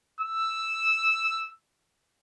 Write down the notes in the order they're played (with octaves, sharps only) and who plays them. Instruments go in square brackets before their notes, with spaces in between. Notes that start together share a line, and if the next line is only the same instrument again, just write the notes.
[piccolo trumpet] E6